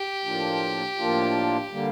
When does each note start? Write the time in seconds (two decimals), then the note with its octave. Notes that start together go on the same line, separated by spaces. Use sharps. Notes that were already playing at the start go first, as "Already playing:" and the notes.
Already playing: G4
0.24 A2 F3 A#3 D4 F4
0.97 A2 F3 A#3 D4 F4
1.72 D3 G3 A#3